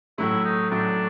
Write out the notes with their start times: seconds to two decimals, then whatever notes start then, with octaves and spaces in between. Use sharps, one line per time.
0.18 A2 F#3 A3 E4
0.45 D#4
0.71 A2 F#3 A3 D4